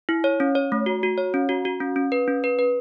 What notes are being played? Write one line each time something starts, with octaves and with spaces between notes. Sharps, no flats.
E4
C#5
C#4
C#5
A3
F#4
F#4
C#5
C#4
F#4
F#4
C#4
C#4
B4
C#4
B4
B4